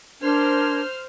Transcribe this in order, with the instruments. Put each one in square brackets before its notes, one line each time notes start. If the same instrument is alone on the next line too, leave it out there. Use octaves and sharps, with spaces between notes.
[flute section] D4 A#4 G#6 [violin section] C5 F6